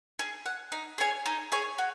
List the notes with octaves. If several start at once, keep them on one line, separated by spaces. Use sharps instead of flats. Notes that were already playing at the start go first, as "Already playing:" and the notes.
G#4
F#5
D#4
G#4 C#5 G#5
D#4
G#4 C#5 G#5
F#4